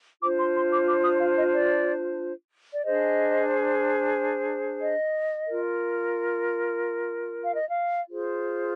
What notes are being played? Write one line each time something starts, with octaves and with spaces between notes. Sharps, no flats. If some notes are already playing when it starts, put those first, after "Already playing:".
D4 F4 C5 D6
C6
C6
D6
D6
D#6
F5
D#5
D5
D5
D4 G#4 C5 D#5
D#5
F4 A#4
F5
D#5
F5
F4 G#4 C5